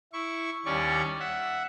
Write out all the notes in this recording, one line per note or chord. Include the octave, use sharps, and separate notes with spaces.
E4 C#6
D#2 G3 C#4 D5 C#6
E5 F#5